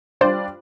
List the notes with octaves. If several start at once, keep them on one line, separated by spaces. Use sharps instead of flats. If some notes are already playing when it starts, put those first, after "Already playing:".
G3 D4 F4 C5 D5